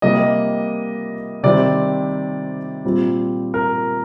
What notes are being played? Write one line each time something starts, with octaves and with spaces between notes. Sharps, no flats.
C3 G3 A#3 D#5
C3 D#3 G3 C4 D5
A#2 G3 C4
A#4